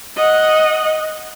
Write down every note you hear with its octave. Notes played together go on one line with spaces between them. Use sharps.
D#5 F#5